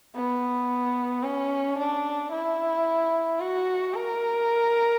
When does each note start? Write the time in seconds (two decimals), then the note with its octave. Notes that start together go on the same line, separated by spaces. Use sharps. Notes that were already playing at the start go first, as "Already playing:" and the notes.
0.16 B3
1.23 C#4
1.78 D4
2.32 E4
3.40 F#4
3.94 A#4